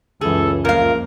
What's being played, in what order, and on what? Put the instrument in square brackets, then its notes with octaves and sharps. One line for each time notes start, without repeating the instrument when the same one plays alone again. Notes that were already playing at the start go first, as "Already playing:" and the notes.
[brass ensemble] C#2 [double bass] F#2 E3 [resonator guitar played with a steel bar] G#4 [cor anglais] A4
[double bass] F2 A#3 [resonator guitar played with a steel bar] A#2 F5 [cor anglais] A#4